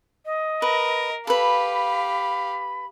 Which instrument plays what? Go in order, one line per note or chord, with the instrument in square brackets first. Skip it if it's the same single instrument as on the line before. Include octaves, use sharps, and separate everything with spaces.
[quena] D#5
[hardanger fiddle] A#4 [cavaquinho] B4
[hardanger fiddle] G4 F5 [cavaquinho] A4 B4 [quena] B5